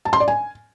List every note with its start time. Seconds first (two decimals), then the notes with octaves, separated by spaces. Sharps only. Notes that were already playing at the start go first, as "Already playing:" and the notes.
0.05 A5
0.13 C6
0.20 D5
0.28 G#5